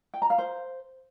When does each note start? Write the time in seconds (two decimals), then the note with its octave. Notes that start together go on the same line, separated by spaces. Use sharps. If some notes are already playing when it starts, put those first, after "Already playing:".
0.14 G5
0.22 A#5
0.30 F5
0.38 C5